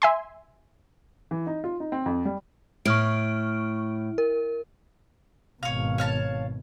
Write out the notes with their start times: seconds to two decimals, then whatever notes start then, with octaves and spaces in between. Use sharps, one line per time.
0.02 E5 G#5 C6
1.31 E3
1.47 D#4
1.64 F4
1.80 D#4
1.92 C4
2.06 F2
2.25 G3
2.85 A2 C#6 F6 D7
4.18 A#4
5.63 G#1 B2 C#5 F5
5.98 C#5 F5 A5